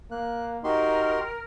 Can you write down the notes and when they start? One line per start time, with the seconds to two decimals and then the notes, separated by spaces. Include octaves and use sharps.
0.11 A#3 F#6
0.64 D#4 F#4 G4 A#4 C6